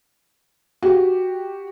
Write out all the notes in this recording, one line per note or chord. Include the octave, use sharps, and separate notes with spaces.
F#4 G4